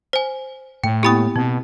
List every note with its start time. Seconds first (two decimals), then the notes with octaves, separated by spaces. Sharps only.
0.13 C5 G#5
0.84 A2 G5
1.03 A#3 B3 E4 G4 B5 D#6
1.36 B2 C4